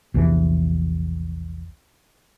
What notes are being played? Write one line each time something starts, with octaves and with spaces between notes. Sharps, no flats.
A#1 E2 C3 E3